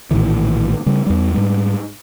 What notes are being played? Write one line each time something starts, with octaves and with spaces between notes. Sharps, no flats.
A#1 A2 D#3 E3
C#3 G3
E2 G3
G#2 G3